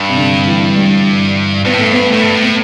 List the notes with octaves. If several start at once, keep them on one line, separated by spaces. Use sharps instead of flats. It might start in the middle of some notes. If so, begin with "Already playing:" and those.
Already playing: G2
C3
D3
E3
G3
G2 B3
A2
G2 A3
B3
A2 A3
G2
A2
B3